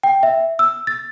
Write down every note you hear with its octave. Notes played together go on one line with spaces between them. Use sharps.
G5
E5
E6
A6